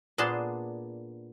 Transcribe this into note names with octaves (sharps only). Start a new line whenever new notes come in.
A#2 B3 D4 G#4 A5 C6